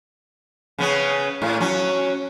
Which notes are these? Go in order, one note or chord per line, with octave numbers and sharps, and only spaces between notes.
C#3 B3 C#4
A2
F#3 C#4